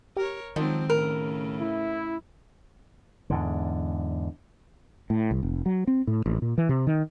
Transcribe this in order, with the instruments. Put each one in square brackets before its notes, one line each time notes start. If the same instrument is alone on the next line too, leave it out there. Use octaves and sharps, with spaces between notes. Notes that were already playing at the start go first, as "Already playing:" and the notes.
[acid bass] G4 [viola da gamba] A#4 C#5
[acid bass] D#3 [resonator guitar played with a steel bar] F3 [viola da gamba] F#3 G#3 C4
[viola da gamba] A2 C#3 [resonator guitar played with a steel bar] A#4
[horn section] E4
[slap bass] E2 G#2 D3
[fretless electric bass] A2
C2
F1
F#3
C4
A2
A1
A#2
E3
C3
D#3